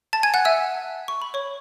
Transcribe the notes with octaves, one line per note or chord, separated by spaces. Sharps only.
A5 A6
G#5 G#6
F#5 F#6
E5 E6
C#6
B5
C#5 C#6